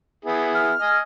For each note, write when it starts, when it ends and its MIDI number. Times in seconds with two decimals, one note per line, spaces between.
0.25 0.72 59
0.25 0.72 64
0.25 0.72 68
0.55 0.99 89
0.80 1.01 75
0.80 1.01 80